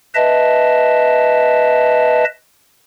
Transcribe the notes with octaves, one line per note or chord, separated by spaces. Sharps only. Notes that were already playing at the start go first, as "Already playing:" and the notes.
B4 D#5 E5 A5